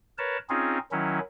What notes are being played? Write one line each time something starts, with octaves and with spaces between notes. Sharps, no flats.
A#4 B4 C#5 A5
C4 C#4 D#4 F4 G#4
D#3 F#3 C#4 E4